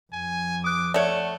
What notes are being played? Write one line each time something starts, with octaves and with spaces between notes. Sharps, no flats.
F2 G#5
D6 D#6 F#6
A3 C#5 D5 E5 F#5